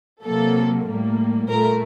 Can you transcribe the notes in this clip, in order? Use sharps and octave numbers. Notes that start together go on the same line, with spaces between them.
C3 F#3 A#3 A4
A2 G3 A#3
A#2 A3 A#4